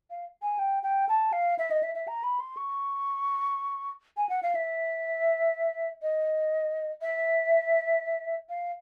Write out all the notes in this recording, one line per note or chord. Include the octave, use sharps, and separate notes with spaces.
F5
G#5
G5
G5
A5
F5
E5
D#5
E5
E5
A#5
B5
C6
C#6
G#5
F#5
F5
E5
D#5
E5
F5